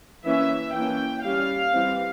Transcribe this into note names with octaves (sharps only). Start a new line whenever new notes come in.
E3 A#3 C#4 E5
E3 A#3 C#4 G5
G3 C#4 F5
E3 G3 C4